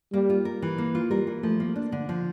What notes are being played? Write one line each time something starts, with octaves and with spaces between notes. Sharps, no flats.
G3 A#3
F4
A#4
E3
A#3
F4
G3 A#4
E3
F3 A3
A#3
D4
D3
F3